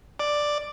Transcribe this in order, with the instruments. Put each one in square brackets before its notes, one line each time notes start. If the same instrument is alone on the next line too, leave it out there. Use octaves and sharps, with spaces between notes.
[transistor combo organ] D5